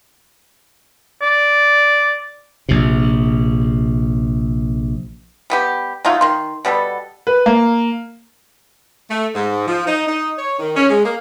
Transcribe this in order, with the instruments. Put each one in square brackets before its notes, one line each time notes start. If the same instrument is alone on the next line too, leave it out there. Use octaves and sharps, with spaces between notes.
[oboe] D5
[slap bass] A#1 C3
[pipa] G3 B3 G4
F#3 A3 D#4 F4
D#3 C6
B2 G3 B3 A4
[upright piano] B4
A#3
[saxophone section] A3
G#2
F3
D#4
D#4
C#5
D#3
C#4
G#3
A#3